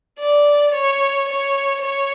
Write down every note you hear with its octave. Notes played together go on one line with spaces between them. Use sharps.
D5
C#5
C#5
C#5